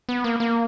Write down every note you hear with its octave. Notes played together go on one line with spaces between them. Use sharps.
B3
A#3
A#3